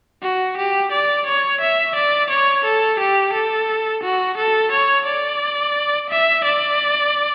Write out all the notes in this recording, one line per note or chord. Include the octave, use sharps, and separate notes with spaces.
F#4
G4
D5
C#5
E5
D5
C#5
A4
G4
A4
F#4
A4
C#5
D5
E5
D5